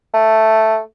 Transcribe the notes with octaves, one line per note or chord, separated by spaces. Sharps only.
A3